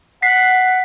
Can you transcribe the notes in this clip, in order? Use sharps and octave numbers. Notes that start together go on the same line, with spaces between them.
F#5 B6 C7